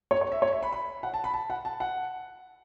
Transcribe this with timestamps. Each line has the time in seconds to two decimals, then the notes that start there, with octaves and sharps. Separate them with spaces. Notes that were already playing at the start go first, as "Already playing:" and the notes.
0.11 C#5
0.21 C#5
0.32 E5
0.42 C#5
0.52 E5
0.63 B5
0.73 B5
1.03 F#5
1.14 A5
1.24 B5
1.34 A5
1.50 F#5
1.65 A5
1.80 F#5